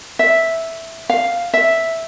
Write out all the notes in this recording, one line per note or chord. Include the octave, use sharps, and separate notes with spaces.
E5
F5
E5